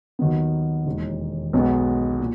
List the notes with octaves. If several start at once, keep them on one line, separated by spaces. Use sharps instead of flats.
D#2 D#3 F#3 B3
E1 D#2 D#3
B1 B2 G#3 B3
A#2